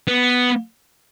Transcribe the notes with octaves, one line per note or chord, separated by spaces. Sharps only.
B3